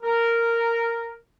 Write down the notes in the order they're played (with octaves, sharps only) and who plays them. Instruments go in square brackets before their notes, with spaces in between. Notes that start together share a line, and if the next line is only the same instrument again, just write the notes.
[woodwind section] A#4